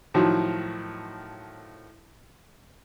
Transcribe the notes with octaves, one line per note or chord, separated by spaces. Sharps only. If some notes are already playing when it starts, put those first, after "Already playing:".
A2 D#3 F3 F#3